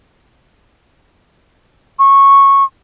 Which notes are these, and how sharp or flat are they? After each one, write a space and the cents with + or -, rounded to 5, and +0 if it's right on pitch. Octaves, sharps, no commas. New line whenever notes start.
C#6 -15